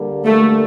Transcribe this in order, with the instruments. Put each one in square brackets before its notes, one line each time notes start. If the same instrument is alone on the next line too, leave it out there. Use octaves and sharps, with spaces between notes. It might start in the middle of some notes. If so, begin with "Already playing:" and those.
Already playing: [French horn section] D3 G3 A#3
[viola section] A3